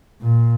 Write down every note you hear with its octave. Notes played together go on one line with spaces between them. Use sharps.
A#2